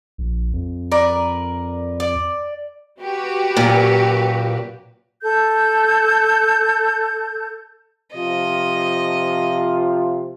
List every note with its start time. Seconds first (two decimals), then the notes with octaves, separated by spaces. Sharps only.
0.18 A#1
0.53 F2
0.92 A#4 B4 D5
2.00 D5
3.02 F#4 G4 B4
3.57 F#2 A#2
5.23 A4 G6
8.14 C3 F3 F4 D#5